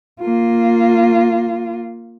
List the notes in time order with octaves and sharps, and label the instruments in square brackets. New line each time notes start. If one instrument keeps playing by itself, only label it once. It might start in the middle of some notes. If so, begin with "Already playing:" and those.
[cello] A#3 F4